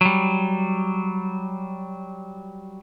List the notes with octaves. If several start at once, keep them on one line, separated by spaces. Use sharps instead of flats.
F#3 G3